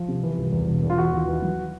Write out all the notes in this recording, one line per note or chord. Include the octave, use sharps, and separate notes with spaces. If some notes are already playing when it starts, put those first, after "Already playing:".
Already playing: F3
C3
E3
C2
E2
E1
E2
F4
E3 F#4
D#2
E3
F#3